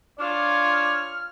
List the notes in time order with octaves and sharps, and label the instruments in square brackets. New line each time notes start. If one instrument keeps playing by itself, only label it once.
[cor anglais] D4 [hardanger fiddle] F4 [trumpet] C#5 [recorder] F6